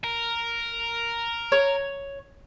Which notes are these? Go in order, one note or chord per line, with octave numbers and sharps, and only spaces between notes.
A#4
C#5